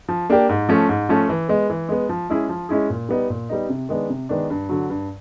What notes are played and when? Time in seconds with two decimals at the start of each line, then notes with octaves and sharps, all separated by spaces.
0.08 F3
0.30 A#3 D4 G4
0.49 G#2
0.69 F3 A3 C#4
0.89 G#2
1.09 F3 A3 C#4
1.29 E3
1.49 G#3 B3
1.70 E3
1.89 G#3 B3
2.09 F3
2.30 G#3 C#4 E4 G#4
2.49 F3
2.69 G#3 C#4 E4 G#4
2.90 A#2
3.09 G3 B3 D#4
3.30 A#2
3.49 G3 B3 D#4
3.69 C3
3.89 D#3 G#3 B3 D4
4.10 C3
4.29 D#3 G#3 B3 D4
4.50 G2
4.69 D3 F#3
4.90 G2